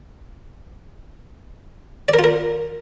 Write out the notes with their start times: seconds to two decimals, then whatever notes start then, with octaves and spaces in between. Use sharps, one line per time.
2.08 D5
2.14 A#4
2.19 F4
2.24 A#4